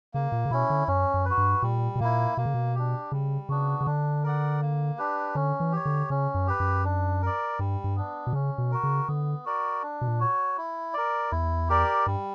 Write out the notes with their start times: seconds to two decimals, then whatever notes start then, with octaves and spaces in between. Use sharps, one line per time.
0.14 C#3 A#3
0.32 A#2
0.45 C#3
0.51 B2 C#4 E4
0.70 D3
0.88 F#2 C#4
1.14 F#2
1.25 B4
1.30 F#4
1.37 G2
1.62 A#2 G3
1.95 B2
2.00 A#2 A#3 E4
2.37 B2 A#3
2.46 C#3
2.54 B2
2.75 D4 G4
3.12 C#3 G3
3.49 C#3 B3 D4 F#4
3.81 C#3
3.86 D3 D4
4.23 A#4 D5 F#5
4.61 A#3
4.98 D4 G4 B4
5.35 D3 C#4
5.60 E3
5.72 G4 C#5
5.85 D3
6.10 C#3 C#4
6.34 F#2
6.47 G4 B4
6.60 F#2
6.85 D4
7.22 A#4 D5
7.59 G2 G3
7.84 G2
7.96 B3 D4
8.27 B2
8.33 C#3 C#4
8.58 B2
8.71 F#4 A#4
8.83 C#3
9.08 D3 B3
9.45 F#4 A#4 D5
9.83 D4
10.01 B2
10.08 A#2
10.20 F#4 C#5
10.57 E4
10.94 A#4 D5
11.31 E2 E4
11.69 G4 A#4 D5
12.06 G2 G3